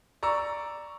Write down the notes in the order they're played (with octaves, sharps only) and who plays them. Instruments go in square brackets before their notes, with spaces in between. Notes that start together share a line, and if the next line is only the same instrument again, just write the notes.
[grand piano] D5 A#5 C#6 E6